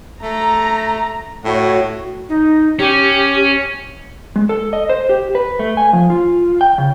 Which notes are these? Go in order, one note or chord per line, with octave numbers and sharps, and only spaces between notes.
A3 A#5
A2 F#4 C#5
D#4
C#4 G4
G#3
A4
D#5
C5
G4
B4
A3
G#5
F3
F4
G5
C#3